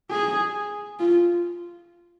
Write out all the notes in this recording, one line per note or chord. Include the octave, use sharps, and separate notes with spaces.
G#4
F4